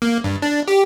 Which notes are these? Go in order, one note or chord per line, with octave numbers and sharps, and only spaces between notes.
A#3
G2
D4
G4